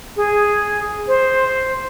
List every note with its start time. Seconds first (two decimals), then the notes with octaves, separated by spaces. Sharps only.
0.16 G#4
1.08 C5